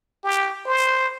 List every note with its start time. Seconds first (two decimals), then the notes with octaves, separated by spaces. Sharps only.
0.24 G4
0.66 C5